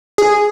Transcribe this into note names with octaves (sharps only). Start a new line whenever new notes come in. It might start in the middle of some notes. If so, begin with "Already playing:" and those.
G#4